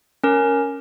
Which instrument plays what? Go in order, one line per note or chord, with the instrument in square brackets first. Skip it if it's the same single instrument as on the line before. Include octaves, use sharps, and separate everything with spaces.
[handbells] C#4 A#4